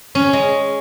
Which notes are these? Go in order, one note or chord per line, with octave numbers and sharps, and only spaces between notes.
C#4
G#3